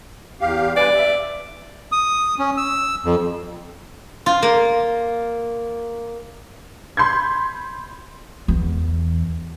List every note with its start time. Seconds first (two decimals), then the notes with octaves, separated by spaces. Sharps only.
0.41 E2 G4 F5
0.77 G2 B4 D5 G#5
0.94 E5
1.92 D#6
2.39 C#4
2.57 E6
3.05 F2
4.26 F4
4.42 A#3
6.97 B5 C6 G6 G#6
8.48 E2